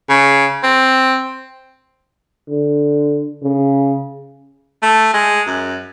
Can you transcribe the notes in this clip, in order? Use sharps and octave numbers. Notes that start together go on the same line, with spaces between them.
C#3
C4
D3
C#3
A3
G#3
F#2